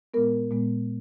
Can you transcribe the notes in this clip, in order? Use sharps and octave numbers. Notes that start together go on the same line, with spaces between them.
A#2 G#3 B3 A#4
A#2 G#3 B3